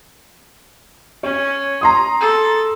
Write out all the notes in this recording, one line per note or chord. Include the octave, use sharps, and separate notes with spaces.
C#4 C#5
A#5 C6 D#6
A4